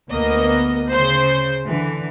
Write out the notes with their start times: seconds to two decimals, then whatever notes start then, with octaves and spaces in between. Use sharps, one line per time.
0.11 D2 A#3 B3 D#5
0.90 C#3 C5 G6
1.66 D3 E3